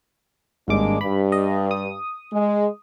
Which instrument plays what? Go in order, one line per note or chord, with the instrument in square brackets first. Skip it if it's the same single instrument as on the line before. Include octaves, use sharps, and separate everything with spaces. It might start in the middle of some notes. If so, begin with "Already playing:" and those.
[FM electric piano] G#1 G2 D6 [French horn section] G#3 A#3 D4
[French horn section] G2 [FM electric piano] B5
[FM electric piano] D#5
D#6
[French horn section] G#3